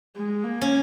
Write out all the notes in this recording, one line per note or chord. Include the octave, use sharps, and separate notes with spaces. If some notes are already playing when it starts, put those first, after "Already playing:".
G#3
A#3
C#4